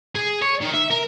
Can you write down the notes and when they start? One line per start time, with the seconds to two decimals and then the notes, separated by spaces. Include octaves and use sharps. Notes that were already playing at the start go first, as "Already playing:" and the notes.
0.15 G#4
0.42 C#5
0.61 D#3
0.74 E5
0.90 A#4